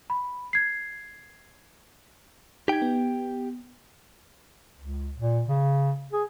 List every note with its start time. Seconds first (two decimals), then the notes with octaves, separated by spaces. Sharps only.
0.10 B5
0.53 G#6 C7
2.68 D#4 G4 G5 G#6
2.82 B3
4.78 C#2
5.18 A#2
5.49 C#3
6.13 G#4